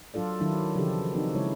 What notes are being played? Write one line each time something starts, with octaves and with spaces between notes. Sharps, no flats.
F#3 D4 F4 A4 D5
D#3 F#3 D4 E4
C#3 E3 F3 D4 G4 A4
C4 D4 D#4 F#4 A4
C#3 G#3 E4 C#5